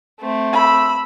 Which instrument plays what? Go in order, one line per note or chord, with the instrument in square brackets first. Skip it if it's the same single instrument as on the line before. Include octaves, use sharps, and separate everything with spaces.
[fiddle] A3 C4
[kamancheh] B5 E6